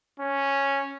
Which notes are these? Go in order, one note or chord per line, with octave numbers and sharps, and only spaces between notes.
C#4